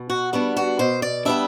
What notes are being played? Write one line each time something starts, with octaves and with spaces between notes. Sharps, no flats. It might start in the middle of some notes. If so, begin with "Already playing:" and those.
Already playing: B2
F#4
G3 B3 D4 F#4
F#4
B2 C5
D5
G3 B3 D4 E5